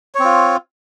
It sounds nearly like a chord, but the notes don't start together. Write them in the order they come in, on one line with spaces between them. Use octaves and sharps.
C#5 C4 F4